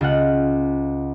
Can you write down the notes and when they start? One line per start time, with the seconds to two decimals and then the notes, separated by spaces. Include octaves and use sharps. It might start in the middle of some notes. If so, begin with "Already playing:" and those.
0.01 C#2 F4 F#5